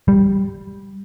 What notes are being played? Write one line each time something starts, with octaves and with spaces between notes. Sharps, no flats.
G3